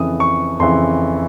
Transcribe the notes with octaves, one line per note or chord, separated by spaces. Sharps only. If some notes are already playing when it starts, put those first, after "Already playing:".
Already playing: F2 C#3 E3 D#6
C#6
F2 C#3 E3 C6